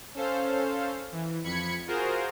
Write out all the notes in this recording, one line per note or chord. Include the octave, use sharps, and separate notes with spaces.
C#4 A4 C5 F5
E3
F2 B5 G#6 C#7
F4 F#4 G#4 A#4 C5